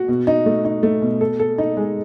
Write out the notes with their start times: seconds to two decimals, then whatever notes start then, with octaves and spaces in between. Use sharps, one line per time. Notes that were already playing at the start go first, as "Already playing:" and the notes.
Already playing: F#4
0.08 B2
0.27 D#4
0.46 A3
0.65 D#4
0.83 A3
1.02 B2
1.21 A4
1.40 A4
1.58 D#4
1.77 G#3